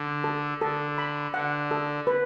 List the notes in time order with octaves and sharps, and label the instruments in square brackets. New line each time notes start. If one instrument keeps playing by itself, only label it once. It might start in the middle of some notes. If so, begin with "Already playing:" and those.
Already playing: [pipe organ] D3
[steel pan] A4
[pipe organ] D3 [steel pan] A4
[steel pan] B5
[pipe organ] D3 [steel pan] F#5
[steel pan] A4
B4